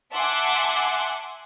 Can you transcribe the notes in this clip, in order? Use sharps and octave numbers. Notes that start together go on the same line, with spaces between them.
E5 F#5 G#5 A5 C6 D6